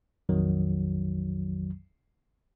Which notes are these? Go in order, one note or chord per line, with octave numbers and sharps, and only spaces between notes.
A#1 F2 D#3 F#3